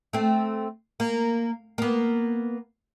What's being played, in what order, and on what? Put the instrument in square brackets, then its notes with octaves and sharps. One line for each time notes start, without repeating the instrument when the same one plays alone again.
[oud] A3 C4
A#3
A#3 B3